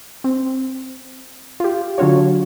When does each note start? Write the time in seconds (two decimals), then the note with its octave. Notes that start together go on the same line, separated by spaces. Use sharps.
0.24 C4
1.60 F4 G4
1.98 D3 F#3 D4 F4 F#4 C#5